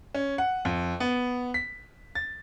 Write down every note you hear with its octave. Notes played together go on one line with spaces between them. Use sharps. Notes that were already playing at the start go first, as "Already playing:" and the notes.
C#4
F#5
F2
B3
B6
A6